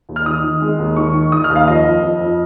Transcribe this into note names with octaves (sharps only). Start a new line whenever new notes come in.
D#2
F6
D#3 D#6
D#3
G#3
D#2
D#3 C#6
D#3
D#3 D#6
F6
D#2
F5
F2 D#5
F2
F2
F2